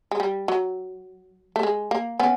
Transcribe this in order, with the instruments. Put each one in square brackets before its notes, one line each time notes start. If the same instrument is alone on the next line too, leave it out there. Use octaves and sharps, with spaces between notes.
[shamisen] G#3
G3
F#3
A3
G#3
A#3
B3 C#4